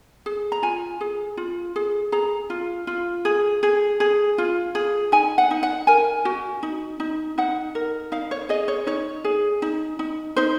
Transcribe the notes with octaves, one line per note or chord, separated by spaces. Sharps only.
G#4
A#5
F4 G#5
G#4
F4
G#4
G#4 A#5
F4
F4
G#4
G#4
G#4
F4
G#4
D#4 G#5
F#5
D#4
F#5
A#4 G#5
F#4
D#4
D#4
D#4 F#5
A#4
D#4 F5
C#5
G#4 D#5
C#5
D#4 C#5
G#4
D#4
D#4
D#4 C5